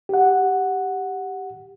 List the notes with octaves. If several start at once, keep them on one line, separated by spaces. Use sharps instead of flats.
G4 F#5